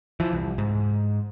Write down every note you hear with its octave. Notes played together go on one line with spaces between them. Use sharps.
E3 F3
C2
G#2